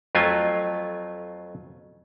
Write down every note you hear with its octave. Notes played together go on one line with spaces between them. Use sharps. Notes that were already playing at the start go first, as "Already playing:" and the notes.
F2 F#3 A3 F4 D#5 G#5